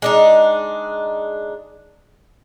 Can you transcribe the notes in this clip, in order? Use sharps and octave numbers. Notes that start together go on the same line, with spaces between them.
G#3 D4 D#4